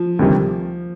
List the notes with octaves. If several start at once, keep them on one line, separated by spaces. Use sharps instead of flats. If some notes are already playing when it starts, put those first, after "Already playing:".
Already playing: F3
D2 C3 D#3 G3